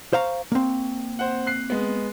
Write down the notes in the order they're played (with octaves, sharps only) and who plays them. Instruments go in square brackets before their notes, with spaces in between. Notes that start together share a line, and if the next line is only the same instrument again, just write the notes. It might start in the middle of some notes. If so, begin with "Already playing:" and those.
[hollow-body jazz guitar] C5 F5 A#5 [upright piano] C#6
[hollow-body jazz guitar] A#3 C4
[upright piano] C5 F#5
F#6 C7
G#3 B3